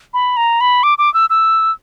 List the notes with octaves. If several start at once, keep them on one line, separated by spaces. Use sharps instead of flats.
B5
A#5
B5
D6
D6
E6
E6